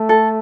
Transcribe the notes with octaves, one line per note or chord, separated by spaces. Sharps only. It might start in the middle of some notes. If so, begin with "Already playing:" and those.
Already playing: A3
A4